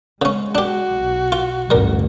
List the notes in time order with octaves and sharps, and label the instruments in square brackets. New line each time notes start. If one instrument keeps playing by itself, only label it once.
[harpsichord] C#3 C#4 [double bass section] G#3
[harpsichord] D4 G4 [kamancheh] F#4
[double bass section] B1
[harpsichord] F4
[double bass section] A1 D2 G2 [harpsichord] G3 A#4